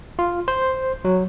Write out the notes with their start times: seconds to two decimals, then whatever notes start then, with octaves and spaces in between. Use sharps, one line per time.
0.19 F4
0.48 C5
1.05 F#3